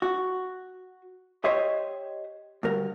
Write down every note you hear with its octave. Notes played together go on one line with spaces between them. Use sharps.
F#4
G4 C5 C#5 D#5 E5
D2 G2 A#4